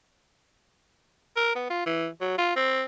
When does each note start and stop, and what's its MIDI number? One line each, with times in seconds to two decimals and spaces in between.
1.36 1.55 70
1.55 1.67 59
1.70 1.83 65
1.86 2.08 52
2.21 2.34 54
2.38 2.52 65
2.56 2.84 60